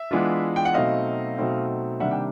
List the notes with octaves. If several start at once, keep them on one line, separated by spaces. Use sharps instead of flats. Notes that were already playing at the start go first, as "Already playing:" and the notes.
Already playing: E5
E3 G#3 B3 D4 F4
G5
F#5
B2 F#3 A3 C4 D#4 D#5 F5
B2 F#3 A3 C4 D#4
C3 D#3 G3 A#3 D4 E5 F#5
G5